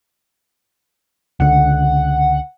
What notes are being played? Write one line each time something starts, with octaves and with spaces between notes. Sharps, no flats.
C#2 D3 F#5